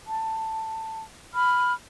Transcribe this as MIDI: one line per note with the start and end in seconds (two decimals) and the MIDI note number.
0.06 1.02 81
1.33 1.73 83
1.33 1.73 89